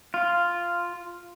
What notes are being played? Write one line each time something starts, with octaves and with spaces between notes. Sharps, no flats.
F4